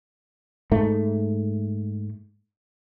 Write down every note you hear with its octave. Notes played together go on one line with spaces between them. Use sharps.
G#2 A3